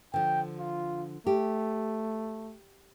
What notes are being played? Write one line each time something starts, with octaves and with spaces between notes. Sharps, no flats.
D3 F3 G5
F4
A3 G4